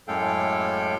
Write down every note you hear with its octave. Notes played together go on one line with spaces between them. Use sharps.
F#2 A2 G#3 A4 F5 G5